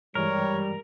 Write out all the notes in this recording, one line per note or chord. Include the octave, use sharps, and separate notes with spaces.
G2 E3 G3 G#3 A#4 C#5